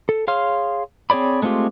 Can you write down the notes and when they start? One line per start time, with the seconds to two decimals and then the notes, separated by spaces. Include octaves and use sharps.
0.09 A4
0.28 G#4 C#5 F5 C6 F6
1.10 C4 G#4 C#5 D5 B5
1.42 G#3 A3 C4 F4 G4